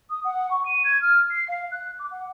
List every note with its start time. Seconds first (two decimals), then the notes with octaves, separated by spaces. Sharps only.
0.10 D#6
0.24 F#5
0.51 C#6
0.65 D#7
0.84 G#6
1.01 F6
1.30 C7
1.48 F5
1.71 F#6
1.99 D6
2.11 F#5